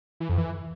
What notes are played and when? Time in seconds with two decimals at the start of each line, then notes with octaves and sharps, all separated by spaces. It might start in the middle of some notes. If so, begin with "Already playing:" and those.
0.20 E3
0.29 F2
0.38 E3